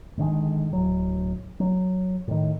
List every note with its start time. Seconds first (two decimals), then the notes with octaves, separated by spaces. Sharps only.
0.17 G#2 D3 D#3 G#3
0.73 D1 F#3
1.60 F#3
2.28 A2 D#3